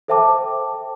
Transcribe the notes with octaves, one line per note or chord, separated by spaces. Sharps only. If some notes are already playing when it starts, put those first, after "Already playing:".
A4 C5 E5 G5 A5 D6